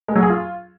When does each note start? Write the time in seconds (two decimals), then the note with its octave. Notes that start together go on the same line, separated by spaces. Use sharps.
0.08 G#3
0.15 F#3
0.23 G#4
0.30 F4